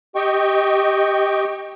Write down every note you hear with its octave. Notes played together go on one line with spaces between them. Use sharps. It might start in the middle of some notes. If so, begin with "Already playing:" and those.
G4 D#5 G5 C#6